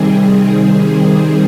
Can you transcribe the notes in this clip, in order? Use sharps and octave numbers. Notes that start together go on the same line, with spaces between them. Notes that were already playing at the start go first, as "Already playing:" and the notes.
Already playing: C3 D#3 G3 C4 G#4
G#4
G#4